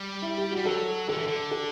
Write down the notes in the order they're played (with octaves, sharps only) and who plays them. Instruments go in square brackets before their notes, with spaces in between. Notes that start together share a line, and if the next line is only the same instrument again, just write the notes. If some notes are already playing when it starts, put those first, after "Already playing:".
Already playing: [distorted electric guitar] G3
[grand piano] E4
G4
F#4
[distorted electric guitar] G3
[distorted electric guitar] F#3 [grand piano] A4
[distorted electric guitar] D3 [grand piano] A4
[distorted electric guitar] E3
D3
[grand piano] A4